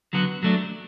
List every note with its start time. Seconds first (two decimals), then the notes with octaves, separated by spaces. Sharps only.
0.13 D3 F#3 B3 F#4
0.43 F#3 A3 D4